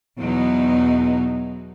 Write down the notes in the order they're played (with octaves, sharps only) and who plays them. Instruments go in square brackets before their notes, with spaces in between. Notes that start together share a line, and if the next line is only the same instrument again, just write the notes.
[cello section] E2 B2 F#3 B3 D#4